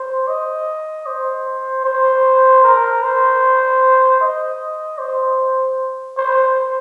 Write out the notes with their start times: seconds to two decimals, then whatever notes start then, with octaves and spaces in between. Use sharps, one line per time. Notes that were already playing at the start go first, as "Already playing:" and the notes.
Already playing: C5
0.28 D#5
1.06 C5
1.84 C5
2.63 A#4
3.03 C5
4.21 D#5
4.99 C5
6.17 C5